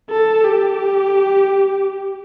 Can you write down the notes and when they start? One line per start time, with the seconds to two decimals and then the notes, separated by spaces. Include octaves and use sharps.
0.11 A4
0.44 G4